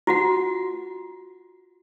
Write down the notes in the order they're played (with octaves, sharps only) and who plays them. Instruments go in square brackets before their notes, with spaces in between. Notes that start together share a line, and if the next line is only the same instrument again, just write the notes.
[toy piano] F4 F#4 F#5